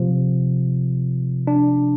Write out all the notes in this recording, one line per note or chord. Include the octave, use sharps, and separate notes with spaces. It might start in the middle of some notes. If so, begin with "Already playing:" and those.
Already playing: C3 F3
D4